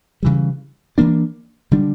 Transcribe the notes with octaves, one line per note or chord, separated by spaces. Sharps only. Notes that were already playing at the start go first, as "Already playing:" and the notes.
C#3 E3 G3
E3 A#3 D4
D3 G3 D4